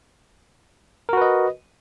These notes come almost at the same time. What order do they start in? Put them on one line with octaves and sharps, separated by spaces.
A#4 F#4 B4 D#5